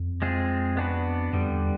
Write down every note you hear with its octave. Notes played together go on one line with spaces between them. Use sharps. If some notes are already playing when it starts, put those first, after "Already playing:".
Already playing: F2
G#3 C4 F4 G#4
B3 D4 F#4 B4
F2 D3 G3 B3
E2